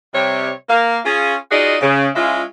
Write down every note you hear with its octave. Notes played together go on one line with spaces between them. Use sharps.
C3 G3 C#5
A#3 F5
C#4 F4 G#4
D#4 F4 F#4 G#4 D5 D#5
C#3
G#3 C#4 E4 F4